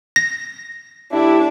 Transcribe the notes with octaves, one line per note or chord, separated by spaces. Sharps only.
A#6
A2 D4 E4 G4